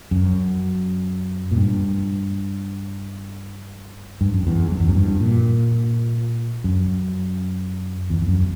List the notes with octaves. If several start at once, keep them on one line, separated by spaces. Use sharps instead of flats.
F#2
A#2
G2
G2
F#2
E2
F#2
E2
F#2
G2
A#2
F#2
E2
E2
F#2